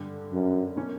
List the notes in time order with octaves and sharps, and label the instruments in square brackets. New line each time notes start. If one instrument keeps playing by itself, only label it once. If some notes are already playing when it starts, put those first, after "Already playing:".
Already playing: [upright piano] G2 D3 G3
[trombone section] F#2
[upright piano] B2 A#3 C#4